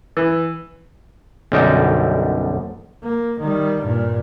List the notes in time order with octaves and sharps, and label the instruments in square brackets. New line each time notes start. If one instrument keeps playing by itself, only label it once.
[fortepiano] E3
[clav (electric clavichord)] B1 F#2 D3 G3 D#4 G5
[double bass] A#3
D#3 G3
G2 A#2